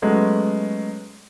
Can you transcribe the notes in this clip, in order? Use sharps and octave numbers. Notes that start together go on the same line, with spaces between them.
F#3 G#3 A3 B3 C#4